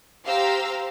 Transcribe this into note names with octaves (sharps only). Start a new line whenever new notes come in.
G4 C5 F5 A#5 E6